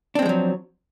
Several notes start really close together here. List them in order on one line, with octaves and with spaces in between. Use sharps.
D4 C4 G#3 F3 F#3